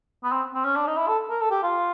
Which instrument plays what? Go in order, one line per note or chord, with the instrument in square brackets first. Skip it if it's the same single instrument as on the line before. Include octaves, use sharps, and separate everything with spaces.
[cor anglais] B3
C4
C4
C#4
D4
D#4
E4
A4
A#4
A4
G4
F4